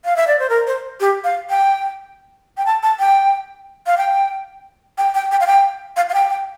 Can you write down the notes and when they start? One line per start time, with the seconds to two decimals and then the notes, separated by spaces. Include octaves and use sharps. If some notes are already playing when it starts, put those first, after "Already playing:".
0.05 F5
0.16 E5
0.27 D5
0.39 C5
0.49 A#4
0.67 C5
1.00 G4
1.24 F5
1.50 G5
2.57 G5
2.66 A5
2.83 A5
2.99 G5
3.87 F5
3.98 G5
4.98 G5
5.15 G5
5.31 G5
5.41 F5
5.47 G5
5.97 F5
6.09 F5
6.14 G5
6.30 G5